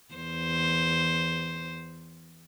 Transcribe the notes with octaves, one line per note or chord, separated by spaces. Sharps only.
E2 C5